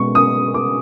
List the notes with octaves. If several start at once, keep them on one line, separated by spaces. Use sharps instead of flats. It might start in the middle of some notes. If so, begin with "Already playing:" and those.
Already playing: B2 G#3 C#6
D#6
D6